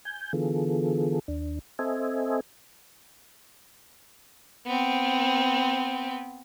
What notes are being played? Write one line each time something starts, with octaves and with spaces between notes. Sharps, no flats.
G#5 G6
D3 E3 B3 F4 G#4 A4
D#2 D4
C4 A4 C5 D#5 E5 G#5
B3 C4